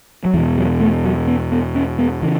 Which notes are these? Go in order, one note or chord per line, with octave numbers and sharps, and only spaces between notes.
F#3
E2 B2 E3
F#3
A3
F#3
B3
B3
C#4
B3
C#3 E3